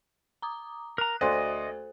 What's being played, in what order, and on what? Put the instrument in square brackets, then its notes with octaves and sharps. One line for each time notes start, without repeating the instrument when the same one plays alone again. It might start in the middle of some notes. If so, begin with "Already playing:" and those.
[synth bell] A#5 D6 D#6
[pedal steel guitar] A#4 A#5 [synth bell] F#6
[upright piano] D2 D5 C6 [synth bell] F#4 A4 C5 [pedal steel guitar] D#5